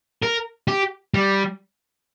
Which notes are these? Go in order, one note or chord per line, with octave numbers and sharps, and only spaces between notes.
A#4
G4
G3